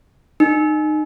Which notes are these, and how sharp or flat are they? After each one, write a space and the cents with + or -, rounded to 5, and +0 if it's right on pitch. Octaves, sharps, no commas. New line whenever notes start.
D#4 -25